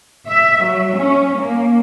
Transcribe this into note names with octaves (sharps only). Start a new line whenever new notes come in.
E5
F#3
C#4
A#3